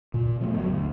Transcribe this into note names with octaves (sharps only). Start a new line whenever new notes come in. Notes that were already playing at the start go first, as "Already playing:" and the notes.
A#2
B2 F3 A3 B3
G1 F#3
D2